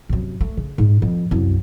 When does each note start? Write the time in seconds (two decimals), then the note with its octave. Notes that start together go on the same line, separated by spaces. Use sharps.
0.09 F#2 C3
0.41 A3
0.57 C#3
0.78 G#2
1.02 F2
1.31 C2 F#2